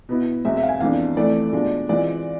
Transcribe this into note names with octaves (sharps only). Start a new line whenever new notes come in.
B2 B3 E4
E2 B2 G#3 C4 E5
E5
F5
G#5
F2 E3 G#3 B3 D4 F5
F2 E3 A3 D5
B2 G#3 D4 F4
E3 G#3 C4 F4 D5